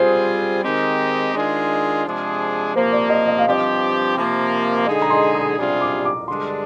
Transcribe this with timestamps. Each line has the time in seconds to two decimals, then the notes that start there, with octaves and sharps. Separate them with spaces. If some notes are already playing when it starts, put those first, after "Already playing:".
Already playing: G3 C4 F4 G#4 C5
0.63 D#3 G#3 C4 D#4 G4
1.34 D#3 G#3 D4 F4 G#4
2.05 C3 F3 G#3 D4 G#4
2.75 C3 F3 A#3 C5
2.92 D5
3.10 D#5
3.28 D#5
3.38 F5
3.45 G2 F3 C4 G4 D#5
4.16 C3 F3 A#3
4.76 F5
4.86 D3 G#3 D#4 G#4 D#5
5.02 A#5
5.10 C6
5.35 D#6
5.57 C3 G3 D4 F4 G#4
5.81 D6
6.05 D6
6.28 G2 D3 G#3 D4 G#4 C6